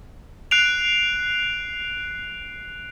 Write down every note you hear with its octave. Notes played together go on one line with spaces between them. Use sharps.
F#6 C7 D7 F7